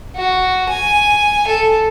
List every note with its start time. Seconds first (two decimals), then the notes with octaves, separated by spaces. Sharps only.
0.16 F#4
0.69 G#5
1.47 A4